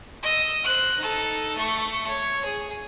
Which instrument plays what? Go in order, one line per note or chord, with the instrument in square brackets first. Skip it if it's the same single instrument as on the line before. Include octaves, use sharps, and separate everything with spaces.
[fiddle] D#5 E6
C5 F#6
D#4 A4
A3 C#6
C#5
G#4